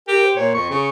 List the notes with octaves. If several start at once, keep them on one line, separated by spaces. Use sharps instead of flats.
G4 A#4
C5
A#2 C#5
F2 C#6
C#3